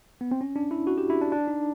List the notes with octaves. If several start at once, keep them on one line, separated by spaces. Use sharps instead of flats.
B3
C4
C#4
D4
E4
F#4
G4
E4
D4
D4
D#4